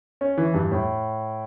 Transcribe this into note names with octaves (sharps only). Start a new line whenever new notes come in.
C#4
E3
G2
A2